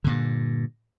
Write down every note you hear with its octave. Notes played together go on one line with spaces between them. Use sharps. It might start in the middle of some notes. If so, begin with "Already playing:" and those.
G2 A#2 D3